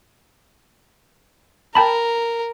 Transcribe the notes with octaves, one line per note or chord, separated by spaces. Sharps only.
A#4 G5 A5 B5